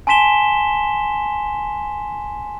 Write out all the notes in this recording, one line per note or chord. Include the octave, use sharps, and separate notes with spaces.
G#5 A5 C6 B6 E7 G7